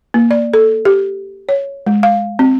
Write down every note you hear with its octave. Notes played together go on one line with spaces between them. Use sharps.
A#3
D5
A4
G4
C#5
G#3
F5
C4